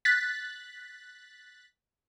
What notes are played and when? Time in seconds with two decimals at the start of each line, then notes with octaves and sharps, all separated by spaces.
0.05 F#6 A6 B6